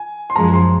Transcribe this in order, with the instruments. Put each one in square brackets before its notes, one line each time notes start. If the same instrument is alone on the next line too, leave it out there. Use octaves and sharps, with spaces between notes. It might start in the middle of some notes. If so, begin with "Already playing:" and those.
Already playing: [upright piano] G#5
C6
[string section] F#2 F3 G#3 [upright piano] A#5
[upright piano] C6